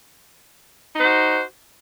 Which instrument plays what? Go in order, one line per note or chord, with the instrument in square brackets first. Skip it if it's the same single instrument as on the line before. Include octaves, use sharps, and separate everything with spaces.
[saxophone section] D#4
C5
F#4